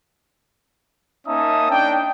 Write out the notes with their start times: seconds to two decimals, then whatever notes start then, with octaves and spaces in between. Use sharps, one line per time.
1.28 A#3 C#4 D#4 E5 A5 D#6
1.71 D4 D#4 G5